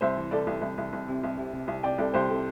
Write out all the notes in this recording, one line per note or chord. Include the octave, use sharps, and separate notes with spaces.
C2 C5 E5
E3
C2 A4 D5
C2
C2
C2
C2
C3
C2
C3
C3
C2
C3 D5 G5
C2 A4 D5
C2 G4 C5
C3 A4